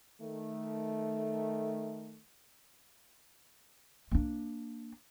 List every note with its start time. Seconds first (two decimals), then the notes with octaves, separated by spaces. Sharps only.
0.20 D#3 A3
4.11 A#3 D4